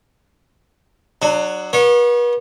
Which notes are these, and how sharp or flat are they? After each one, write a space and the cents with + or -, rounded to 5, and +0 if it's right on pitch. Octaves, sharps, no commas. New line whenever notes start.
F#3 +0 D4 +30
B3 -40 C#5 -20